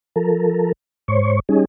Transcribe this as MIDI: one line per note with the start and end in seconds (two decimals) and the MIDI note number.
0.16 0.72 53
0.16 0.72 69
0.16 0.72 70
1.08 1.40 44
1.08 1.40 72
1.08 1.40 73
1.08 1.40 85
1.49 1.65 55
1.49 1.65 61
1.49 1.65 63
1.49 1.65 68